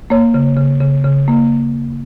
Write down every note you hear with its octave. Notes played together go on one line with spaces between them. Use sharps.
A#3 C#5
C#3
C#3
C#3
C#3
A#3